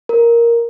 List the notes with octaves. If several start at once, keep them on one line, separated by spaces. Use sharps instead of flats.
A#4